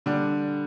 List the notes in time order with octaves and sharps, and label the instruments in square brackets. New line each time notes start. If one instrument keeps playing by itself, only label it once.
[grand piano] D3 G3